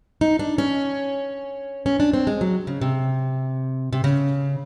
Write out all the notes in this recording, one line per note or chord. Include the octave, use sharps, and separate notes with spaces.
D#4
D4
C#4
C#4
D4
C4
G#3
F#3
C#3
C3
C3
C#3